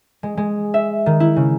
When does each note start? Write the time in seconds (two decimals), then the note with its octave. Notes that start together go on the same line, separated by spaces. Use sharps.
0.23 G#3
0.37 G#3
0.74 E5
1.06 D#3
1.20 E4
1.36 C#3